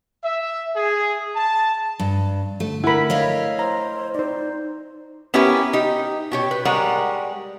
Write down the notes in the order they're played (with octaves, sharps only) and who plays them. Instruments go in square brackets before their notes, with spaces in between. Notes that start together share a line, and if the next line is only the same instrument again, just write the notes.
[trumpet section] E5
G#4
A5
[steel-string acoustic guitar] G2
[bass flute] D3 [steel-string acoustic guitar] A3
[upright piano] E4 A#4 [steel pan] F#5 B5
[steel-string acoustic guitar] C#5 D#5 F5
[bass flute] C5 [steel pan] A#5
[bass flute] D#4 [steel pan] C5 D5
[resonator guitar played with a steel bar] B3 C#4 E4 G4 A#4 B4
D#4 G4
B2 G4 C#5
B4
G3 G#3 A#4 C#5 D5 F#5